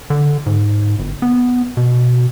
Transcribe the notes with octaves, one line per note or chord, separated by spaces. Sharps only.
D3
G#2
G1
B3
B2